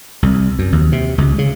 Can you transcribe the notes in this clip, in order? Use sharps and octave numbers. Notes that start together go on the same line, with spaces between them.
C2
F#2
D#2
C3
C#2
C#3